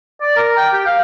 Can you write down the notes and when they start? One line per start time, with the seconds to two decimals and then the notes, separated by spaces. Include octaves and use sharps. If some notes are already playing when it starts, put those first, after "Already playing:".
0.21 D5
0.36 A#4
0.57 G5
0.73 G4
0.86 F5